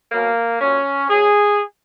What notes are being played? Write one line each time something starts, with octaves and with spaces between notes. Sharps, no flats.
B2 F#3 A#3
A#2 F#3 C#4
B2 F#3 G#4